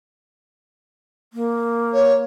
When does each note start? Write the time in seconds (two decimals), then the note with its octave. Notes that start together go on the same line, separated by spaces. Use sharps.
1.33 A#3
1.93 C#5